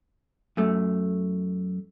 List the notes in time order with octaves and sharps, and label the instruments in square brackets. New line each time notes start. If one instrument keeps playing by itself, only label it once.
[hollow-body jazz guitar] F#2 A3